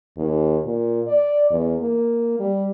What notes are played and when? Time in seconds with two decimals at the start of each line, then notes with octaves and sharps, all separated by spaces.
0.17 D#2
0.65 A#2
1.07 D5
1.51 E2
1.81 A#3
2.39 G3